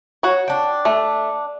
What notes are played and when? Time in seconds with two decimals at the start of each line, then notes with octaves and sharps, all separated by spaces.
0.23 F#4 C#5
0.48 D4 G5
0.85 A3